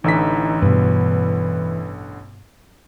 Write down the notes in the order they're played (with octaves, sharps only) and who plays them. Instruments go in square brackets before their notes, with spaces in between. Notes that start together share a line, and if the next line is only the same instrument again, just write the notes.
[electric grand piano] A1 D3 B6 [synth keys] E3 [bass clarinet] D#4
[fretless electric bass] G2 B2 [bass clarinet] B4